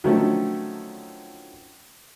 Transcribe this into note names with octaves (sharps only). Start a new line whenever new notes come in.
D3 D#3 F3 F#3 A3 C#4